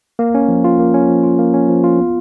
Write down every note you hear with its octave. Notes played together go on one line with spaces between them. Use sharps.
A#3
C#4
F3
F4
A#3
C#4
F3
F4
A#3
C#4
F3
F4
B3